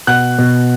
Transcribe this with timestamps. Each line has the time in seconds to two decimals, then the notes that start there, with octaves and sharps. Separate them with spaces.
0.07 B2 F#5 F#6
0.38 B2